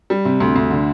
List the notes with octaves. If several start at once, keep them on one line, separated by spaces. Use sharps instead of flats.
G3
C3
D2
D2
D3